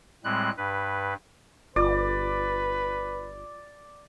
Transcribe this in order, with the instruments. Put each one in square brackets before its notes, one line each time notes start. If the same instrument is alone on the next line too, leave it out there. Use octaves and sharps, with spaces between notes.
[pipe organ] A2 G3 G#3 C4 F#6
G2 B4
[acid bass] G1 [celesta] F4 D6 [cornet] B4 [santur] D5